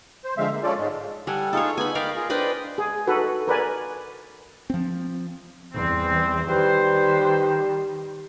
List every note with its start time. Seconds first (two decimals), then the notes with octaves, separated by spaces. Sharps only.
0.25 C5
0.38 D3 F3 G#3 C4 E5 F5
0.51 A#3
0.63 C#4 F4 A4 D5
0.78 G#2 G#3
1.27 G3 A4 F#5 G#5
1.53 D#4 F4 G#4 A4 C#5
1.77 B3 D#4 G#5 B5
1.95 D#4 A#4 D5 F5 G5 B5
2.16 F4 G#4
2.30 D4 B4 C5 D5 D#5 G5
2.78 G#4
3.07 D#4 F#4 A4 B4
3.48 A#4 B4 D5 G#5
4.70 F3 C4
5.73 E2 E3 G3 C4
6.49 D#3 G3 B4 C5